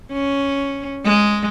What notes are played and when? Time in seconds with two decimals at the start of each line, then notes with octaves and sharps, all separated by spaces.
0.12 C#4
1.04 G#3